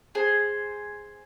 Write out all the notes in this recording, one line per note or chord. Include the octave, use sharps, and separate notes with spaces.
G#4 C5